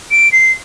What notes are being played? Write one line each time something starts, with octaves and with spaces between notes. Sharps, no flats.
D7
C7